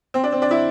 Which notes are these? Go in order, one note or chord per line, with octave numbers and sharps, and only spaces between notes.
C4
D4
C4
D4
E4